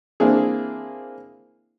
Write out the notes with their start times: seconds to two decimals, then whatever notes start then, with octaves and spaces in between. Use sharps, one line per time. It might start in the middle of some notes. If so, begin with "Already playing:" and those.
0.20 A#3 C4 D4 E4 G#4